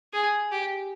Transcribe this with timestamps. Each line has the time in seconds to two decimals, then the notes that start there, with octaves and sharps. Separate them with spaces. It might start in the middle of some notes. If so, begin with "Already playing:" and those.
0.14 G#4
0.52 G4